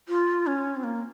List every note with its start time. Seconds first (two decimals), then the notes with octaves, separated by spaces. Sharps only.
0.09 F4
0.47 C#4
0.76 C4
0.84 A#3